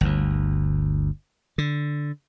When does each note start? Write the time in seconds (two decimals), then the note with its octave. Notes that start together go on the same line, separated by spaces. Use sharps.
0.01 G1 D2
1.58 D3